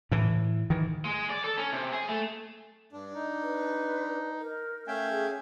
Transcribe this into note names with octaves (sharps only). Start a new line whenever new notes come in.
A2 E3
D#3 E3
G#3
D5
A4
C#4
C3
G#4
A3
G2 D4
D#4
B4
A#4
A3 C#4 E5 F5 G5 G#5
G#4